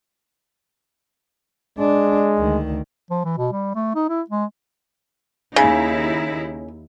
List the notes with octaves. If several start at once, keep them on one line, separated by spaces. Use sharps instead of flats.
G#3 D4
D2 D#3
F3
E3
B2
G3
A3
D#4
E4
G#3
D#2 C#3 D#4 E4